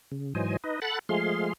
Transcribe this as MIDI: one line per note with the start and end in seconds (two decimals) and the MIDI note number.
0.12 0.33 49
0.35 0.57 44
0.35 0.57 52
0.35 0.57 54
0.35 0.57 72
0.35 0.57 75
0.35 0.57 80
0.64 0.80 63
0.64 0.80 71
0.64 0.80 75
0.82 0.99 69
0.82 0.99 78
0.82 0.99 83
0.82 0.99 90
0.82 0.99 93
1.09 1.53 53
1.09 1.53 56
1.09 1.53 57
1.09 1.53 68
1.09 1.53 77
1.09 1.53 84